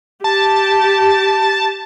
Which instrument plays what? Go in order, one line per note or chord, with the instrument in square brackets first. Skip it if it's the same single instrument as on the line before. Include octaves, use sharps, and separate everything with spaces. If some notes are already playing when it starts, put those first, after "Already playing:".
[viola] G4 [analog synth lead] A5